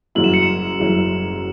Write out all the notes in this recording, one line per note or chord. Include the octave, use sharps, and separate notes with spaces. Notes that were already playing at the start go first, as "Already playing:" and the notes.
F#1 F#2 F#3 E4 F#7
E7
C#7
E7
F#1 F#2 F#3 E4